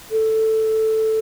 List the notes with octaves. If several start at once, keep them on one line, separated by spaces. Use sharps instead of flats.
A4